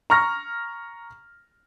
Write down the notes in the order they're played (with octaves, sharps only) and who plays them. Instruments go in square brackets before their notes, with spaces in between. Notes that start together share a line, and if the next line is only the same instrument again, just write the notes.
[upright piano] A#5 C#6 F6 A#6